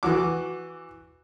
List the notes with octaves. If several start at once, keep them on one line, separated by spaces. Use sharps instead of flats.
E3 F#4 D6